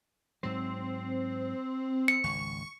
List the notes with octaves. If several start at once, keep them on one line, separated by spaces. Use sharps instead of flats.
G#2 F#3 C4
C#7
G#1 C#2 C#6